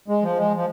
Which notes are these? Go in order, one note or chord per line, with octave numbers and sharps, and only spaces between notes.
G#3
F3
G#3
F3